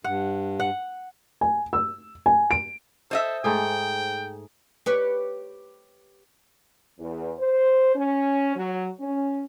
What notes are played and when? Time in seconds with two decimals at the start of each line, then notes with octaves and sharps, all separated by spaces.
0.04 G2 F#5
0.60 F#5
1.41 G#5
1.73 E6
2.26 G#5
2.51 D7
3.11 A4 C5 D#5 E5
3.44 G#2 A3 G#4 G5
4.86 G4 B4 C#5
6.99 E2
7.39 C5
7.95 C#4
8.55 F#3
9.00 C#4